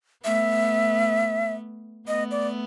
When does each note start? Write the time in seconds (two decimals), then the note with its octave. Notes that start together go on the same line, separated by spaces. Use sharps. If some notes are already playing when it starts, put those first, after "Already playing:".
0.24 A3 B3 E5
2.08 A3 B3 D#5
2.31 D5